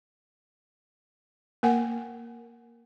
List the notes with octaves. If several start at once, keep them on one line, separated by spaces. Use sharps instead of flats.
A#3 A#4 F#5 G#5